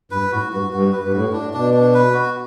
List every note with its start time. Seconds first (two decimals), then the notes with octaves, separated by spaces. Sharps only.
0.11 G2 B4
0.32 A2 F#4
0.52 G2 F#4
0.72 G2 F#4
0.92 B4
1.03 G2
1.13 A2 F#4
1.32 D4
1.53 B2 D4
1.74 D4
1.94 B4
2.14 F#4